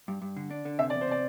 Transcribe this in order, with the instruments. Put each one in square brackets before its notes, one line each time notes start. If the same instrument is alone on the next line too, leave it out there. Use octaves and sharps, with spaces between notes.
[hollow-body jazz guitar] G2
G2
D3
D4
D3
[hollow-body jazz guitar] C3 [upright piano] E5
[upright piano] D5
[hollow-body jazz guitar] E2
[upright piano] C5
[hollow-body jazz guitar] C3 [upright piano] D5